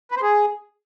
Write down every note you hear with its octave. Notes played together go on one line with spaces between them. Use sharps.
B4
C5
G#4